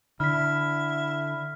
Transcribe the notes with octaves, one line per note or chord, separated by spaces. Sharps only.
D3 E4 F6 B6